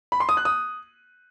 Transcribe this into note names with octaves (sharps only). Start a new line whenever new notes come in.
B5
C6
D#6
F#6
D#6